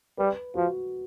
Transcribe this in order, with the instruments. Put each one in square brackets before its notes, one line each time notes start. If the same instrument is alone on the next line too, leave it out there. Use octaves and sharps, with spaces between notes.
[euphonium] G3 [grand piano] B4
[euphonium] F3 [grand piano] F#4